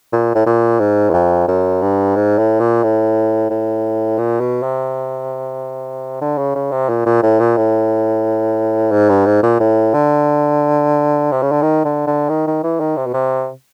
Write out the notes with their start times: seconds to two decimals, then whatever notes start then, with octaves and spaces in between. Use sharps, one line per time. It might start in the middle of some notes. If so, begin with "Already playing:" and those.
0.12 A#2
0.35 A2
0.46 A#2
0.79 G#2
1.10 E2
1.14 F2
1.48 F#2
1.82 G2
2.16 G#2
2.38 A2
2.60 A#2
2.83 A2
3.50 A2
4.18 A#2
4.40 B2
4.63 C3
6.21 D3
6.38 C#3
6.55 C#3
6.72 C3
6.89 A#2
7.06 A#2
7.23 A2
7.40 A#2
7.57 A2
8.91 G#2
9.09 G2
9.26 G#2
9.43 A#2
9.60 A2
9.94 D3
11.32 C3
11.42 C#3
11.52 D3
11.63 D#3
11.85 D3
12.07 D3
12.29 D#3
12.47 D#3
12.64 E3
12.80 D#3
12.97 C3
13.06 B2
13.14 C3